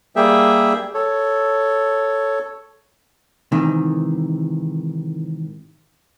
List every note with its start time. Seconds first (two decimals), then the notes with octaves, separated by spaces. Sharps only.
0.16 G3 A#3 G#4 E5 G5
0.94 A4 C#5
3.52 G#2 C3 D#3 E3